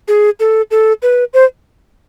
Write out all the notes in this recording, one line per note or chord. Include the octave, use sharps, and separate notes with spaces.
G#4
A4
A4
B4
C5